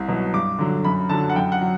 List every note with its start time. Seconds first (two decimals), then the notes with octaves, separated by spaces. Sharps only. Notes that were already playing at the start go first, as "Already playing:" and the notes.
Already playing: C2
0.08 B2 F#3
0.33 G2 D6
0.59 D3 F#3
0.84 F#2 B5
1.09 D3 A5
1.13 F#3
1.29 F#5
1.36 F#2 G5
1.52 F#5
1.61 F#3